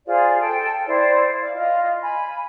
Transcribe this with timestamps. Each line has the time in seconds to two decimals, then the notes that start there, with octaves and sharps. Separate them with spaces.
0.06 F4 G#4 C5 D5
0.39 A4 G5
0.86 E4 C5 D5
1.41 D5 F5
1.54 F4 D#5
2.03 G#5 B5